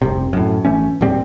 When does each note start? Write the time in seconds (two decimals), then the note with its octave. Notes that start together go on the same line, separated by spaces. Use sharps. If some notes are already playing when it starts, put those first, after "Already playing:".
0.02 F1 C2 C3
0.33 F#2 A2
0.65 G#1 E3 A3 C#4
1.01 D1 D#2 G3 C4